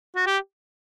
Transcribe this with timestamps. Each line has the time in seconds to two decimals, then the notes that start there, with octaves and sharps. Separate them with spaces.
0.16 F#4
0.26 G4